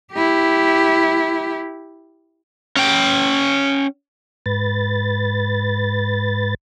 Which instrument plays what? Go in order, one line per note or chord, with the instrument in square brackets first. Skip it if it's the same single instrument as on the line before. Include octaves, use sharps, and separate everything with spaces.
[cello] E4 G4
[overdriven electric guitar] C#4 G5
[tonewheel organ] G#2 B4 A6